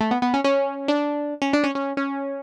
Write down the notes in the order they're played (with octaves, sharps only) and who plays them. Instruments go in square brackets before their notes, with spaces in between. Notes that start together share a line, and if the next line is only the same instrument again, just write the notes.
[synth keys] A3
B3
B3
C#4
C#4
D4
C#4
D4
C#4
C#4
C#4